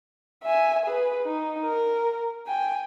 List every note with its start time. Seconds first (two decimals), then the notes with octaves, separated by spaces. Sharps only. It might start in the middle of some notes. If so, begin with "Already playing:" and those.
0.44 E5 G#5
0.86 G#4 B4
1.23 D#4
1.65 A#4
2.47 G5 G#5